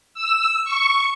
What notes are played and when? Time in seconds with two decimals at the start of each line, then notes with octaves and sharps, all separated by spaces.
0.14 E6
0.64 C#6